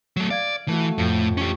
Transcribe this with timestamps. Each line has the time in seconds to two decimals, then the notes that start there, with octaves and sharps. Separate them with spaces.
0.17 F#3 A3
0.30 D5 F5 G#6
0.68 E3 A3 F#4
0.98 F2 A2 G5
1.37 C#4 G4 C#6